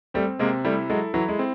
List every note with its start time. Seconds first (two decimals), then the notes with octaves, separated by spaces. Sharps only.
0.14 G3 A3 C4
0.39 C3 G#3 A#3
0.64 G3 A3 E4
0.90 F#3 G#3 A4
1.14 E3 F#3 E4
1.28 G#3
1.39 C4